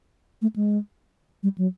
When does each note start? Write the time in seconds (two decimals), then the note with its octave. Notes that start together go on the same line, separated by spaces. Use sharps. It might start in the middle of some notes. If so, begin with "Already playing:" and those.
0.42 A3
0.56 G#3
1.43 G3
1.58 F#3